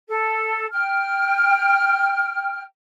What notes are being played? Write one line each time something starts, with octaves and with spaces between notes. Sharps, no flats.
A4
G5 F6